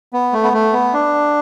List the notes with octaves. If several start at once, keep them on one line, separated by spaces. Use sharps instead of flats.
B3
A3
B3
A3
B3
D4